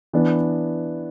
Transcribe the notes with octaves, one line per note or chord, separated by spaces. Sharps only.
E3 B3 D4